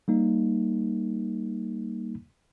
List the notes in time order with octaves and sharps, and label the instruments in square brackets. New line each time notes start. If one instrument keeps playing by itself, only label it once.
[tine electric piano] G3 A#3 D#4